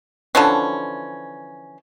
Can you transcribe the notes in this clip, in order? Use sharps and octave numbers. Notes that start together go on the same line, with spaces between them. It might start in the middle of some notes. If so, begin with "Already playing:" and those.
D3 E3 F3 C#4